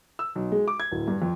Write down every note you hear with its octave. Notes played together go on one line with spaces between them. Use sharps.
E6
B1
G#3
D6
G#6
D1
G2
F2